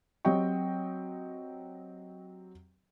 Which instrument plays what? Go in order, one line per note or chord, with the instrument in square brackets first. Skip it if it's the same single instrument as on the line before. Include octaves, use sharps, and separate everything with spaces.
[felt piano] F#3 C4 G4 D#5 G5 C#6